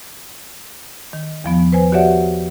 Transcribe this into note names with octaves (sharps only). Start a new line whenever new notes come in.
D#3
E2 F3 B3
B4 C5 G#5
F#4 G4 C#5 D5 E5 F#5